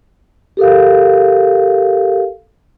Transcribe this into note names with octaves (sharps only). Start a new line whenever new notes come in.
G4 A4 A#4 F5